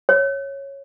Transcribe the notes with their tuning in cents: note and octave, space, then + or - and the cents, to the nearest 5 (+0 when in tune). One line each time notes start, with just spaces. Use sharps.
C#5 -10